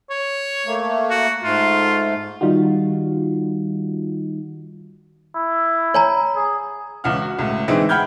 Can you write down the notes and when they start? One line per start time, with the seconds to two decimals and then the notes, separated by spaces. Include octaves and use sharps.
0.10 C#5
0.66 A3 A#3
1.10 F#4
1.43 G#2 A3 F4
2.41 D#3 G3 D#4 F4 F#4
5.35 E4
5.94 C#5 G#5 A#5
6.36 G#4
7.04 C#2 E3 F#5 F6
7.22 F#4
7.39 C#2 A2
7.68 D3 E3 G#3 C4 D#4
7.89 F#5 G5 B5 F6 G6 G#6